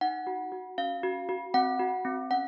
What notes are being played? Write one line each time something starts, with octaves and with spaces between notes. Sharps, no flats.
D#4 F#5
F#4
F#4
C#4 F5
F#4
F#4
C4 F#5
F#4
C4
C#4 F#5